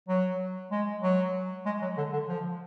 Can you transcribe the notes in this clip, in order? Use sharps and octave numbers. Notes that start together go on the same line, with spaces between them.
F#3
G#3
F#3
G#3
F#3
D3
D3
F3